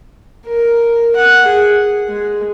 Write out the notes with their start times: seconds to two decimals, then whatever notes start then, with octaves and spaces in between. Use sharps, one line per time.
0.46 A#4
1.15 F#5
1.46 G#4
2.08 G#3